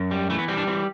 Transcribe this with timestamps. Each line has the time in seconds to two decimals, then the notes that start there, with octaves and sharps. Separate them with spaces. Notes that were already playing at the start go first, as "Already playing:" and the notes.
Already playing: F#2
0.11 G3
0.30 E3 A3
0.39 B3
0.48 G3 C4
0.57 D4
0.67 E3 C4